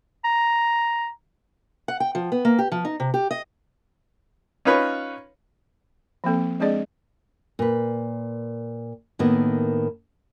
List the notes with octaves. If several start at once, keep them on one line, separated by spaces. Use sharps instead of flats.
A#5
F#5
G5
F3
B3
A#3
G4
F3
D#4
C3
G4
D#5
C#4 D#4 F4 B4 C#5 B5
F3 A#3 C4 A4
G#3 C4 D4 G#4 D5 D#5
A#2 B4
A2 D#3 A#3 B3